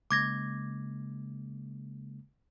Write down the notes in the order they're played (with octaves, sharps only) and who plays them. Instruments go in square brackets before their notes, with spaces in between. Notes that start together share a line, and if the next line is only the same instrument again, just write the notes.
[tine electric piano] C#3 G#3 A#3 [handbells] D6 G#6 A#6